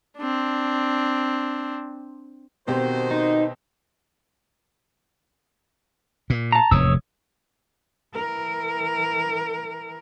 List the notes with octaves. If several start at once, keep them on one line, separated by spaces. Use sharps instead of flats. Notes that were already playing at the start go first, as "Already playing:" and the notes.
C4 D4
B2 D#3 C4 F#4 G4 C5
D#4
A#2
A5 A#5
F1 E2 G#2 C#5 D#6 E6
E3 A#4